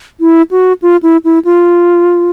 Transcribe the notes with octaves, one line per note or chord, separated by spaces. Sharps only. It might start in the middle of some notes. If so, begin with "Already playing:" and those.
E4
F#4
F4
E4
E4
F4